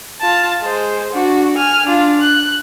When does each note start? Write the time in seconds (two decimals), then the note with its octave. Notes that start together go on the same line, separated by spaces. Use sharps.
0.21 F4 A5
0.62 G#3 C5
1.13 D4 F#4
1.57 G#5 F6
1.86 D4 F4
2.21 F#6